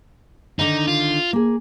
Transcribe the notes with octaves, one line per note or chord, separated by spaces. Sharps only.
D3 D#3 D#4
F4
A#3 G#4